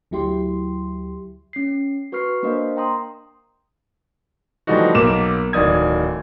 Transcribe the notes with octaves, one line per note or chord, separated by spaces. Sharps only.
D2 F#3 E4 G4 C6
C#4 C7
F#4 B4 C#6 F6 C7
A#3 D4 A#4 C5 D#5 F5
G5 A#5 C6 D#6
E3 F3 G3 A3 D#4 F#4
B1 A#3 D6 E7
D1 D#3 D5 D#6 G#6